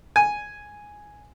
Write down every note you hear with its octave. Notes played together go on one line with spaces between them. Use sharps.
G#5